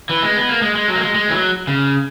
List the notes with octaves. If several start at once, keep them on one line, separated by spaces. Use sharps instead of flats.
E3
G#3
B3
A#3
G#3
G#3
F#3
A#3
G#3
G#3
E3
F#3
C#3